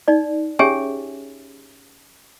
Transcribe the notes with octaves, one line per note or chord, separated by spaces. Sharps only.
D#4 D5
C#4 G4 G#4 C#5 E5 G#5